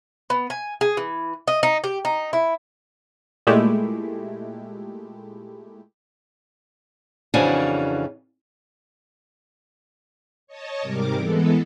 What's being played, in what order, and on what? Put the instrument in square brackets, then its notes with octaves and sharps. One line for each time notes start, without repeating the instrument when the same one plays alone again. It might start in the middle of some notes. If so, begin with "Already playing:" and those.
[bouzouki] B3
G#5
G#4
E3
D#5
D#4
G4
D#4
E4
[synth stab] A#2 G#3 A3 E4 G4
[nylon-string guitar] F2 C#3 E3 D4 F#4 G#5
[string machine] C#5 D#5 A5
G#2 C3 G3 A#4 D6
E3 G#3 B3 A4